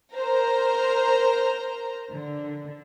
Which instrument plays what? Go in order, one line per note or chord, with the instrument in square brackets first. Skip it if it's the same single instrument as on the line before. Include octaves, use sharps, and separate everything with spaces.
[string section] A#4 C5 A#5
D3